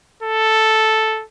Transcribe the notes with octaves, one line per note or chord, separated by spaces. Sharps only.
A4